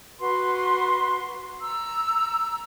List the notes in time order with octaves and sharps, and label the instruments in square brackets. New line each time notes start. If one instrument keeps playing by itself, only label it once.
[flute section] F#4 B4 C6
A#5 E6